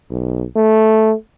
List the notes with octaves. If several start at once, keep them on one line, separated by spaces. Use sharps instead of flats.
B1
A3